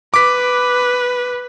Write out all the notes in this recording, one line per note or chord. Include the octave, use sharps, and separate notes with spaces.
B4 D6 B6